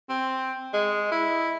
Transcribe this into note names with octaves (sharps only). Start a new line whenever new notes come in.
C4
G#3
E4